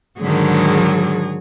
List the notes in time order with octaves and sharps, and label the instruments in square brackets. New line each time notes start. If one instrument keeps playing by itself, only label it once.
[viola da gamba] G#2 D3 D#3 [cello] F#3 G#4